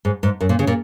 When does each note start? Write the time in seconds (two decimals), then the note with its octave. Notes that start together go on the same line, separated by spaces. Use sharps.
0.05 G#2
0.23 G#2
0.41 F#2
0.49 A#2
0.59 C#3
0.67 A#2